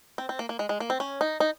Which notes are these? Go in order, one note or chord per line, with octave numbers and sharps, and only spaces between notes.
C4
C4
A#3
A#3
G#3
G#3
A#3
C4
C#4
D#4
D#4